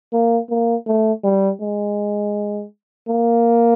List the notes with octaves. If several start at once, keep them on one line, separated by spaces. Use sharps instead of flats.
A#3
A#3
A3
G3
G#3
A#3